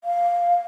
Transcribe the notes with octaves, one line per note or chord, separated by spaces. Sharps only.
F5